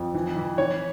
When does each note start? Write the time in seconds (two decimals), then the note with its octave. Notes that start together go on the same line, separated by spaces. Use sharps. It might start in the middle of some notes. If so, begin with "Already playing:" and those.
Already playing: F2
0.14 E3
0.37 E3
0.58 E3 C#5